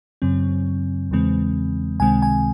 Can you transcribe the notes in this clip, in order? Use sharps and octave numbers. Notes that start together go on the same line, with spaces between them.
F#2 C#3 F#3 C4
E2 C#3 E3 G#3 C4
C#2 C3 D#3 G#3 C4 G#5
G#5